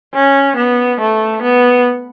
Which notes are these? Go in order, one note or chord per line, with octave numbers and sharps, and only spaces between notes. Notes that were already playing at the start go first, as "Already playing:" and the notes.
C#4
B3
A3
B3